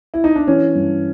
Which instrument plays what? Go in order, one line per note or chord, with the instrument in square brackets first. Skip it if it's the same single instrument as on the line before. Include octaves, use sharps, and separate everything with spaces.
[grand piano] E4
D#4
D4
E3 C#4
G2